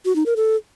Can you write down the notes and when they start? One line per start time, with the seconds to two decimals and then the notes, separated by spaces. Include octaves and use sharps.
0.05 F#4
0.16 D#4
0.26 A#4
0.36 A4